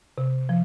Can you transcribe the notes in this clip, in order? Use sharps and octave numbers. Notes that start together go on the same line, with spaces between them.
C3
F3